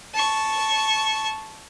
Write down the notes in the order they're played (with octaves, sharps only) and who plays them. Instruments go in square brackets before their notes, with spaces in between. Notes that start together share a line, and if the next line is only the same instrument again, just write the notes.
[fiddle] A5 C#6